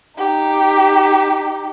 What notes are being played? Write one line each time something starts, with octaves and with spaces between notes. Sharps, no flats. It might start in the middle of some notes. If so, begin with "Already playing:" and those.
D#4 G4